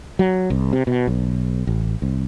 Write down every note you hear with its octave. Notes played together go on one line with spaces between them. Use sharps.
F#3
C2
C3
B2
B1
A1
C2